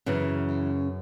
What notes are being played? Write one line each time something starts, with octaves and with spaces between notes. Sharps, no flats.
F#2 C#3 E3